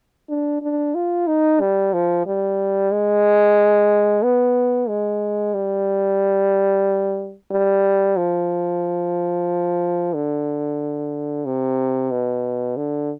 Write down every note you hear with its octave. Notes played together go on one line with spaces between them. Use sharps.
D4
D4
F4
D#4
G3
F3
G3
G#3
B3
G#3
G3
G3
F3
D3
C3
B2
D3